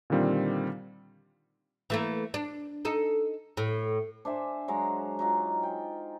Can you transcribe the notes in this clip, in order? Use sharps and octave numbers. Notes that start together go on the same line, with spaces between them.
A#2 D3 D#3 G3 C4 F4
E3 A3 A#3
D4
D#4 A4
A2
D4 C5 E5 G#5
F#3 G#3 F#5 A#5
F#3 D#4 F4
G5